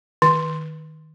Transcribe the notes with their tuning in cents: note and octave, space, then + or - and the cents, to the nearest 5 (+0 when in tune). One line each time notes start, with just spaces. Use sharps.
D#3 +0 C6 -5